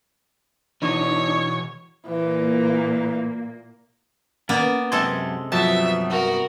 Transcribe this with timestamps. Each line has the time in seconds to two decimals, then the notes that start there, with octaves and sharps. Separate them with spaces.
0.82 B2 E3 D4 D#4 C#5
2.07 A#2 E3 A#3
4.49 A#3 B3 C#4 D5
4.92 F#2 C3 G#3 A4 C6 G#6
5.52 G2 F3 F#3 B3 E5 A5
6.10 F#4 A#4